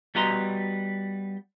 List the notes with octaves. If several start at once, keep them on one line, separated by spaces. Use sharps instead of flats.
G3 B3 F#4 D#5 A#5 C6